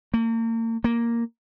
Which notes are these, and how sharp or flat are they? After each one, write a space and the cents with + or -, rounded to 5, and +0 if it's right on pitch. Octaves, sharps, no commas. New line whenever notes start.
A#3 -40
A#3 +0